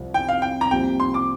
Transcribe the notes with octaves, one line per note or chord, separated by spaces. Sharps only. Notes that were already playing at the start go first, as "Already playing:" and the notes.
Already playing: C2 C3 F3
G5
F5
G5
A#5
C2 C3 F3 A#3 G4 G5
C6
D6